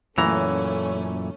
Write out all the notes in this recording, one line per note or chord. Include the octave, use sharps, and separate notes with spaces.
F#2 A#2 E3 A3 C#4 A#5